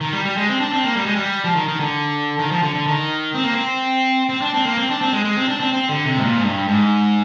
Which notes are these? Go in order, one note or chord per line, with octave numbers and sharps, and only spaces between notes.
D#3
G3
G3
G#3
C4
D4
C4
A#3
G3
G#3
G3
F3
D#3
D#3
D3
D#3
F3
D3
D3
D#3
C4
A#3
C4
C4
D4
C4
A#3
C4
D4
C4
G#3
G#3
C4
D4
C4
C4
D3
C3
G#2
A#2
G#2
G2
G#2